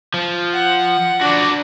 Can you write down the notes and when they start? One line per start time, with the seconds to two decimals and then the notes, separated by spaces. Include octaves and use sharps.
0.14 F3
0.53 F#5
1.21 D4 F#4 D5